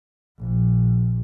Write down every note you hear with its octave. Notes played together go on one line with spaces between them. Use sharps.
A#1